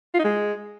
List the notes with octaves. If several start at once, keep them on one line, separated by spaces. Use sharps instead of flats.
F4
D#4
G#3